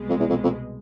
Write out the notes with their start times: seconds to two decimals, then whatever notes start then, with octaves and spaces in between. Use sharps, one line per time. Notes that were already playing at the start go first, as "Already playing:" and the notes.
Already playing: C2 B2 G#3
0.10 F2
0.20 E2
0.29 F2
0.43 F2